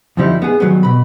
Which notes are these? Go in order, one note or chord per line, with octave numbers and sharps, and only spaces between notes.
F2 D3 F3 G3 D#4 E4
B3 G#4
D#3 F#3 G3 B3
B2 B5